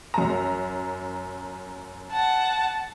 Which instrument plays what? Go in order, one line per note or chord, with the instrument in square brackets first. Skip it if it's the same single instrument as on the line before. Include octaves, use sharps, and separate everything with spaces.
[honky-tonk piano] F#2 A#5
[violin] F#5 A5